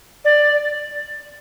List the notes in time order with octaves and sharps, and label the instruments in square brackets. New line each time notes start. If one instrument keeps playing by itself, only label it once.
[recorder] D5